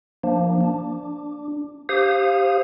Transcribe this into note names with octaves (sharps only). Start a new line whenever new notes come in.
F3 A#3 D4
D4
G4 C5 F5 D#6